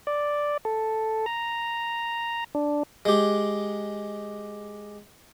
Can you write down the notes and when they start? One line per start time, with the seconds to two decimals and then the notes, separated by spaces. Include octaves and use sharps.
0.07 D5
0.65 A4
1.26 A#5
2.55 D4
3.05 G#3 G4